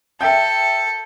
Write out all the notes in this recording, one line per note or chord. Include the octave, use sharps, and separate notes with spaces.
A4 E5 G5 G6